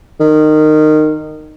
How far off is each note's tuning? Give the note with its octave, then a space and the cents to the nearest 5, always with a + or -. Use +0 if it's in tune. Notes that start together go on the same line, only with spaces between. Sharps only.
D#3 -20